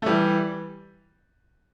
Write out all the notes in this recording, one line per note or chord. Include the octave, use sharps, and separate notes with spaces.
A3
E3 G3